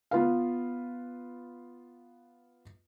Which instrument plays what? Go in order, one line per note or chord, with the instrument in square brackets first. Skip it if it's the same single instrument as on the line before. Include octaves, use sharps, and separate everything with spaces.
[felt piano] B3 F4 B4 F5